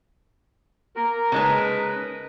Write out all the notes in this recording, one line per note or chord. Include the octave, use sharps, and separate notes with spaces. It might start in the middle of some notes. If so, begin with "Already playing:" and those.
A#3 A#4
C#3 G#3 D#4 B4 A5